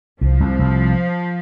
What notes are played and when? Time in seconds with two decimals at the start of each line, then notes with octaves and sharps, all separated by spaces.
0.21 C2 F3
0.40 C2
0.59 C2